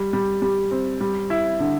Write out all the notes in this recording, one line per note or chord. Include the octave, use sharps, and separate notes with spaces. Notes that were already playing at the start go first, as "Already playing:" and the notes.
Already playing: G3
G3
G3
C4
G3
E4
D3